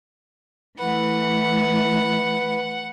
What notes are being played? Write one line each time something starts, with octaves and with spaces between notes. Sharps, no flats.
E3 A3 B4 F#5